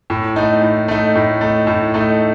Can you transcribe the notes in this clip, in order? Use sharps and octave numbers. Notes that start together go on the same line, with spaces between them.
A2
A3 D#4
A2
A3 D#4
A2
A3 D#4
A2
A3 D#4